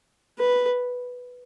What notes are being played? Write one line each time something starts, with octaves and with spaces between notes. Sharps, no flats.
B4